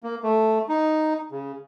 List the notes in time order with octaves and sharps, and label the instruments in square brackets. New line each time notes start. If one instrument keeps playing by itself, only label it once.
[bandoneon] A#3
A3
D#4
C#3